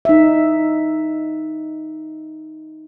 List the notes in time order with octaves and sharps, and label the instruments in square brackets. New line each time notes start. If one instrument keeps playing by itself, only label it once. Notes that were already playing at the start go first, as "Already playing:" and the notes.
[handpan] D#4 E5